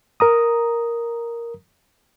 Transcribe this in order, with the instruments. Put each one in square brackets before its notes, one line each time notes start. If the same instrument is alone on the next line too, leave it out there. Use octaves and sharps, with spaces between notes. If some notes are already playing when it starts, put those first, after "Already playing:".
[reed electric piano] A#4 A#5 D#6